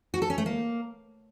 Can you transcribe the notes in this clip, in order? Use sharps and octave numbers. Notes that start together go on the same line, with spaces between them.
F#4
A4
C#4
A3
A#3